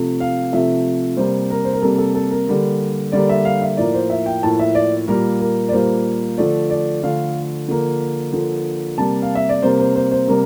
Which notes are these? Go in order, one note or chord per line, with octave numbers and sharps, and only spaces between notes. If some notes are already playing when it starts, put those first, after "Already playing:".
Already playing: C3 F3 A3
F5
C3 F3 A3 E5
C3 G3 A#3 C5
A#4
C5
A#4
C3 G3 A#3 A4
A4
A4
A#4
D3 G3 A#3
D3 G3 A#3 D5
E5
F5
E5
A2 F3 A#3 D5
C5
E5
G5
A2 F3 A#3 A5
E5
D5
A#2 G3 A#3 A#4
A#4
D5
A#2 G3 A#3 C5
D3 F3 A3 D5
D5
D3 F3 A3 F5
D3 F3 A#3
D3 F3 A#3
C3 G3 A#3 A5
F5
E5
D5
C3 G3 A#3 C5
C5
C5
C5
C3 G3 A#3 A#4